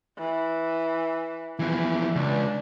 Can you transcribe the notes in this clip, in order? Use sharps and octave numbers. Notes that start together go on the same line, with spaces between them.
E3
F2 E3 E4
C#2 D4